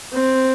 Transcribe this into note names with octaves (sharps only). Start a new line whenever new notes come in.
C4